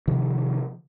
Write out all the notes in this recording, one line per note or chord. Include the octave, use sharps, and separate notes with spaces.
C3 D#3 F3